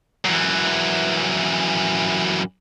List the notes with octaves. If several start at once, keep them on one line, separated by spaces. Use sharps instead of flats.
F#2 E3